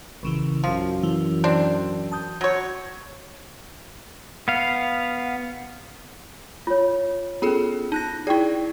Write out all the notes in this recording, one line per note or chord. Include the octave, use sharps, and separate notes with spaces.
A#1 C#3 E3
F#2 F3 F5
E3
C4 D4
A5 D#6 G6
F#3 C#5
B3 F5
F4 C#5
B3 C#4 F4 G#4 A4
D#4 A5 F#6 A#6
E4 G#4 D5 G5 C#6